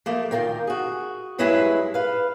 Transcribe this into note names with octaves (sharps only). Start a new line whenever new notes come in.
F3 A3 A#3
D2 D#3 E3 F4 A#4 G5
F#4 G#4
G2 F#3 G#3 E4 G#4 B4
B4 F5